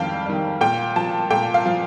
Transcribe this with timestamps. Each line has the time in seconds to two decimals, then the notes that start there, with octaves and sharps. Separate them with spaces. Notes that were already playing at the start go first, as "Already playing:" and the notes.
Already playing: F2 D#3 G3 F5 G5 A5
0.26 D#3 G3
0.61 A#2 G5
0.96 F3 A5
1.31 A#2 G5
1.54 F5
1.66 F3